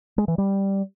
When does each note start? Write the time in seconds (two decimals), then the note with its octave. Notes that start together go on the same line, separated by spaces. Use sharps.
0.18 G#3
0.28 E3
0.38 G3